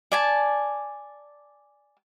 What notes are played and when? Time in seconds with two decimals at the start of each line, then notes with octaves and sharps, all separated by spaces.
0.12 D5 G#5 A5